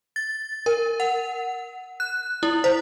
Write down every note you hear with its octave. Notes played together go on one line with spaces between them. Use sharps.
A6
A#4
F#5
F#6
E4
C5